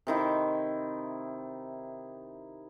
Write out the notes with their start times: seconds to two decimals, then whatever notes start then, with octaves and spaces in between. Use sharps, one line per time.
0.07 C3 D#3 E4